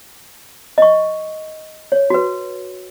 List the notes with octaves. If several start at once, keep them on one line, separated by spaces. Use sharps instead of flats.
D#5 C#6
C#5
F#4 B4